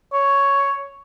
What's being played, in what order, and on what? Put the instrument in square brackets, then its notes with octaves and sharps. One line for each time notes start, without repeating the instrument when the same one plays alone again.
[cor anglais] C#5